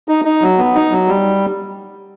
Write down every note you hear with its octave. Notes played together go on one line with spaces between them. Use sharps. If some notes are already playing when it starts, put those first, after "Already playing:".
D#4
D#4
F#3
B3
D#4
F#3
G3